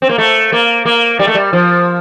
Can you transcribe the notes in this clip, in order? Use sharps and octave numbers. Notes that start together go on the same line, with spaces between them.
C4
A#3
A3
A#3
A#3
G3
A3
G3
F3